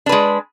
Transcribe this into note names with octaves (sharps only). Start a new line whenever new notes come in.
G#3 D4 B4